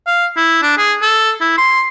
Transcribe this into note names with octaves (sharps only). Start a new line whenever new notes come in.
F5
E4
D4
G#4
A4
E4
C6